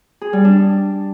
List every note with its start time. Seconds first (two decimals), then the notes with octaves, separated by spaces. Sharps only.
0.21 G#4
0.33 G3
0.45 D4